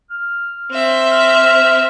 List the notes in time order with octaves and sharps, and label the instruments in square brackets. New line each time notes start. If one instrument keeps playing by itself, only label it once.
[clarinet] F6
[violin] C4 E5
[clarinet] F6